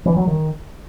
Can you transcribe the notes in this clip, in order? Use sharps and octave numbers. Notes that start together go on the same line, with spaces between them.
E3
F#3
D#3